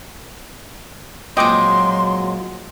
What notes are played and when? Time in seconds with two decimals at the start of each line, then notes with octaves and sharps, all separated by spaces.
1.37 F2 A#2 F#3 G#3 D#5 G5 C6 D6